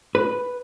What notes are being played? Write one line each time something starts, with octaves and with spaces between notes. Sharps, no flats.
B4